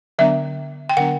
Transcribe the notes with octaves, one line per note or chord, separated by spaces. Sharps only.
D3 F#3 B3 D4 E5
G5
D3 F#3 B3 D4 F#5